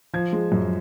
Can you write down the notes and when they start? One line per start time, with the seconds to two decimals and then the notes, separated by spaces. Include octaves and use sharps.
0.13 F3 G#6
0.33 G#3
0.52 F#2